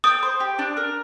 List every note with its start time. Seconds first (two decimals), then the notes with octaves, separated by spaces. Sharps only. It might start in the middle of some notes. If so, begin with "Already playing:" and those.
0.04 G5 D#6
0.23 C5
0.40 G4
0.59 D4
0.77 A#4